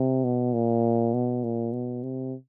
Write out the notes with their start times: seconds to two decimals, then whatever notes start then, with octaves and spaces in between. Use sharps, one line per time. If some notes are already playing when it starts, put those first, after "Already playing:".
Already playing: C3
0.24 B2
0.54 A#2
1.14 B2
1.44 A#2
1.73 B2
2.03 C3